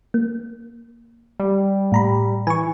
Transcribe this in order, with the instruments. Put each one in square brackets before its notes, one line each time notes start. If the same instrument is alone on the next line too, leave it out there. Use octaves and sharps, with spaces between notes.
[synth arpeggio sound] A#3
[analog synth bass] G3
[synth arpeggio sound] A2 A#5 B5
[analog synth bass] E3 [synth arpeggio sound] G#5 C#6